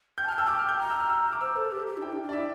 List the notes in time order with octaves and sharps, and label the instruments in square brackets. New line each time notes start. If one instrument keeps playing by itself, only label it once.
[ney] G5 [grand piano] G6
[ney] A5
[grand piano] F6
[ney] G5
[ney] A5 [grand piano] E6
[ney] G5 [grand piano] D6
[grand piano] F6
G6
[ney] A#5 [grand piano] F6
[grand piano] E6
F6
E6
D6
[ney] C5 [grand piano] E6
[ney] A4
G4
G4
D4
[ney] E4 [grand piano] G5
[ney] D4
D4
[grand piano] D5
[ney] E4 [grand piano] E5